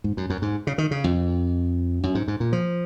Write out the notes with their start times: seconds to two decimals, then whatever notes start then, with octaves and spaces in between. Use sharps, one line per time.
0.04 G#2
0.17 F#2
0.30 F#2
0.42 G#2
0.67 C#3
0.78 D#3
0.91 C#3
1.04 F2
2.03 F#2
2.15 G#2
2.28 G#2
2.40 A#2
2.53 F3